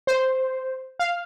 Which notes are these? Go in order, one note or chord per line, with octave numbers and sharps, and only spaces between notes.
C5
F5